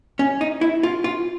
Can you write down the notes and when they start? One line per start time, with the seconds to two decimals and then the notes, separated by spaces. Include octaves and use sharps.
0.19 C#4
0.41 D#4
0.61 E4
0.83 F4
1.04 F4